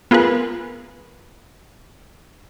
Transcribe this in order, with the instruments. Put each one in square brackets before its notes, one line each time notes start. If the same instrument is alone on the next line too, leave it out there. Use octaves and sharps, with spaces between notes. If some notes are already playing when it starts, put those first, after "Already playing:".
[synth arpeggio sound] B3 F4 G#4 A#4 B4